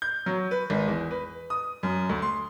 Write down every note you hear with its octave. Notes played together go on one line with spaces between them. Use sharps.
G6
F#3
B4
G#1
E2
B4
D#6
F#2
D2
C6